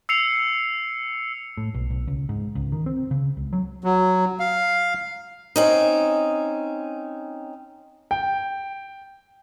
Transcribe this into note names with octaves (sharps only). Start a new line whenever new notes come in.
E6 C7 C#7 F7
A2
B1
B1
C#2
G#2
C#2
D#3
C4
C#3
C#2
F#3
F#3
F5
C4 C#4 D#4
G5